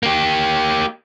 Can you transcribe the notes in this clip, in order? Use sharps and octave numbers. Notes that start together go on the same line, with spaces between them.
A#3 G4